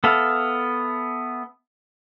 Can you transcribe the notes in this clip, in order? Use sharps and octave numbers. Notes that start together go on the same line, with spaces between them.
B3 A4 E5 F5